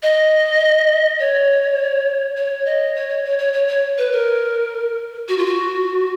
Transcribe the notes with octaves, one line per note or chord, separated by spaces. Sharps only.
D#5
C#5
C#5
D#5
C#5
C#5
C#5
C#5
C#5
C#5
B4
A#4
F#4
F4
F#4